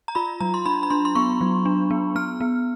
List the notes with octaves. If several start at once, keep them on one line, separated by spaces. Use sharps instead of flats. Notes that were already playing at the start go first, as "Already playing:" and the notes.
A#5
F4 B5
F#3 A#5
C6
D4 B5
B5
D4 C6
C6
B3 C#6
F#3
D4
B3
B3 F6
B3